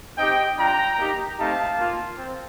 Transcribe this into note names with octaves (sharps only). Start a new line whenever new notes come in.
C4 D#4 G4 D#5 G5
G3 D4 F4 G5 A#5
A#3 D#4 G4
A3 C4 D#4 G4 F5 A5
A#3 F4
C4